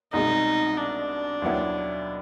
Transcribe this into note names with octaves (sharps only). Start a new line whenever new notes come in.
C2 B2 G#3 D#4
D4
D#2 D#3 F#3 B3 E4